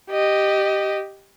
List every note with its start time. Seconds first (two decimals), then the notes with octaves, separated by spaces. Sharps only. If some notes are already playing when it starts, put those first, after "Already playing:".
0.10 G4 D#5